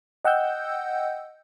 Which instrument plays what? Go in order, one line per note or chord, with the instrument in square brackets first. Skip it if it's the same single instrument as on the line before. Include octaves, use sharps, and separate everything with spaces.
[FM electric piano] D#5 F#5 G5 E6 G6